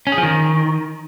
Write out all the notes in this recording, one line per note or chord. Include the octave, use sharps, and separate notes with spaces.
C#4
G#4
F3
D#3